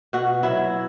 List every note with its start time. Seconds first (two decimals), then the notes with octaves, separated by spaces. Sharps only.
0.13 B2 F#4
0.43 F#3 E4